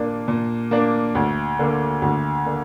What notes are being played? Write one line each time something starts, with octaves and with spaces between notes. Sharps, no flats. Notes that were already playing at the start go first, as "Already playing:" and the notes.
Already playing: A#2 A#3 D4
A#2
A#3 D4
D2
D3 A#3
D2
D3 A#3